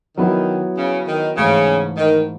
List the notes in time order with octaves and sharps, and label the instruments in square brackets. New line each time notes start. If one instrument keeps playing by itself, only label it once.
[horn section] D#3 [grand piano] F#3 B3 E4
[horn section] C#3
D#3
[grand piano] G#2 E3 A3 E4 [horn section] C#3
[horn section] D#3